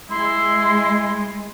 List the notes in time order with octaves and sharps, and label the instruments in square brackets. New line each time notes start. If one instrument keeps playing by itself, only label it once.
[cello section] G#3 [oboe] E4 [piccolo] C6